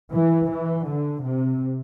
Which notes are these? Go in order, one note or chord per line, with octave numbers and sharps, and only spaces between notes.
E3
E3
D3
C3